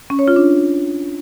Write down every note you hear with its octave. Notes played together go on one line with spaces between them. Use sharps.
C#4
C#5
F4
D4